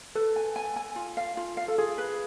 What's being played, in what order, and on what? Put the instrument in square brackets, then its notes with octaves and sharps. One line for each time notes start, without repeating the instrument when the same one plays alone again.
[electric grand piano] A4 [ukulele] B4
[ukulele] G#5
G#5
G#5
F4
F5
F4
F5
[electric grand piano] A4
[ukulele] F4 [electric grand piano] G#4
[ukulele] B4